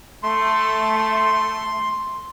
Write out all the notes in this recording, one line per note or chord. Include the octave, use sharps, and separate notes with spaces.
A3 C6